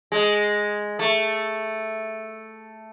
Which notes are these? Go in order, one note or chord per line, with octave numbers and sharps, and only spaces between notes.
G#3
A3